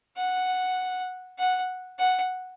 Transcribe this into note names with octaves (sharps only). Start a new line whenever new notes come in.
F#5
F#5
F#5